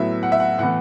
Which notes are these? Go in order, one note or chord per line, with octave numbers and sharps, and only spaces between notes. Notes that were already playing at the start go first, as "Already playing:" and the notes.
Already playing: A2 F#3 B3 E5
F#5
E5
F#5
A2 E3 B3 F#5